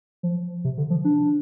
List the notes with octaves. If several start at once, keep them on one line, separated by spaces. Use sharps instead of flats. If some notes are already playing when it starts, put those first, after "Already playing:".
F3
C3
D3
F3
D4